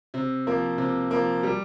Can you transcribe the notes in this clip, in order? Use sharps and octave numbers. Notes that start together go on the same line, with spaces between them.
C3
F3 A#3
C3
F3 A#3
G3